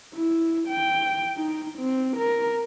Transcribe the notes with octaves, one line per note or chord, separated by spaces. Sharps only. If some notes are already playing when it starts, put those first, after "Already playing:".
E4
G5
D#4
C4
A#4